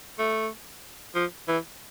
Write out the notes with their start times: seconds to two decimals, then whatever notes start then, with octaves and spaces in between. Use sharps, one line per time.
0.19 A3
1.15 F3
1.48 E3